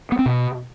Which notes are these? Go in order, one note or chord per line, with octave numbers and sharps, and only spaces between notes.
B3
C4
B2